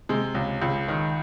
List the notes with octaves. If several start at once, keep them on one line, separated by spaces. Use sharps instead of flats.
C3 G#3
C#2
C#2
D#3